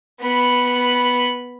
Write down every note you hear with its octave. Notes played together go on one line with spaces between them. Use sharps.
B3 B5